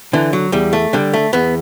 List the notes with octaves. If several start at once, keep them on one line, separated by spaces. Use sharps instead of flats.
D3 E3
F#3
E2 G3
A3
D3 G3
A3
E2 B3